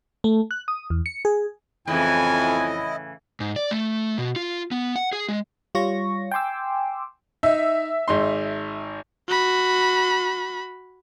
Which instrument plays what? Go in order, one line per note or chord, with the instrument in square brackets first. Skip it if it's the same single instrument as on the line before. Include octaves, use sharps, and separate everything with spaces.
[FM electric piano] A3
F#6
D#6
E2
C#7
G#4
[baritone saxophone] F2 [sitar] A2 C#3 E3 [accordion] E4 D#5 [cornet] G#5
[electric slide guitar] G#2
D5
A3
B2
F4
B3
F#5
G#4
G#3
[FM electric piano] G3 F4 C#5 C#6 A#6
G5 G#5 C6 D6 E6
[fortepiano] D#4 [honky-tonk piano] E5
[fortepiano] G#1 D#4 C6
[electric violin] F#4 B5